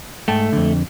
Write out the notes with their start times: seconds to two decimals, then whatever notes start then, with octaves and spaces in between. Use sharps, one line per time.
0.28 G#2 A3 G5 A5
0.52 F2 D3